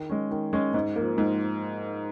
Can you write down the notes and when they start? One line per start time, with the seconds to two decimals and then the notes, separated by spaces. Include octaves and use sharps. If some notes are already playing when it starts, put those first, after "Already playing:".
Already playing: D#3
0.10 G#3 C#4
0.31 D#3
0.53 G#3 C#4
0.74 G#2
0.96 F3 A#3
1.18 G#2